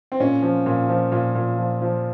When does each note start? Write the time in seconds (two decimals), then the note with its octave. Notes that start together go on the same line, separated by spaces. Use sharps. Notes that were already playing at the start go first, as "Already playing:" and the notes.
0.12 C4
0.20 A#2 C#4
0.42 F3
0.66 A#2
0.89 F3
1.12 A#2
1.35 A#2
1.58 F3
1.82 F3